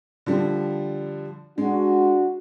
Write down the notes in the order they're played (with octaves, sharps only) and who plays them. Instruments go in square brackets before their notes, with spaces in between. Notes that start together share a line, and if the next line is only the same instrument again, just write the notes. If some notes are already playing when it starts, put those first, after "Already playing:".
[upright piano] D3 F3 G3
[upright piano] G#3 [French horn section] D4 F#4